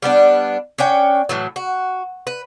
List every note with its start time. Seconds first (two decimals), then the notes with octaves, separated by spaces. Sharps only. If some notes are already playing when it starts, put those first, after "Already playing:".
0.02 G3 B3 D4
0.78 C#4 D4 C#5 G5
1.29 A2 E3 F#3
1.56 F#4
2.27 B4